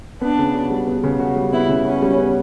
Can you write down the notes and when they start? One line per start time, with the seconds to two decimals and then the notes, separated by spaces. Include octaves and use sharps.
0.21 B3 D4
0.39 C#3
0.55 F#4
0.70 G3
0.87 B3
1.04 C#3
1.19 F#4
1.36 G3
1.53 B3 E4
1.69 C#3
1.85 C#4 F#4
2.02 G3
2.18 B3